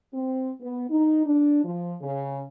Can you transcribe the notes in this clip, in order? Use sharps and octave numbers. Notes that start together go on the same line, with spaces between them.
C4
B3
D#4
D4
F3
C#3